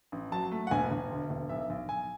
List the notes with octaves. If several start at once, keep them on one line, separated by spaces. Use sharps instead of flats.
A1
F#3 A5
A3
F#5
E1 G#5
E1
D2
E1
B1 E5
B1
B1 G#5